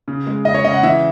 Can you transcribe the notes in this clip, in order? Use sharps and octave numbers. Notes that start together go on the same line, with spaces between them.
C#3
G#3
C#3 D#5
C#5
C#3 D#5
F#5
E3 E5